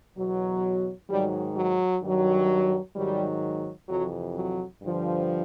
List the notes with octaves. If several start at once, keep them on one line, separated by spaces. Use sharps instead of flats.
E2 B2 F#3
G#2 D#3 F#3 G3
F#3
G2 D#3 F#3
G#2 D#3 F#3 G3
F2 C3 E3 F#3
F#3
G2 D3 F3